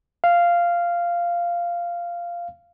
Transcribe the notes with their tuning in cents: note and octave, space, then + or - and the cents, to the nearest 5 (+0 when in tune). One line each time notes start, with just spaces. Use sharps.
F5 -10